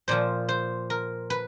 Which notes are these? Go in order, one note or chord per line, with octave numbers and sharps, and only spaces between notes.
A#2 F3 C5
C5
A#4
B4